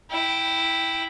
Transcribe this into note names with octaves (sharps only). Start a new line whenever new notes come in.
E4 G5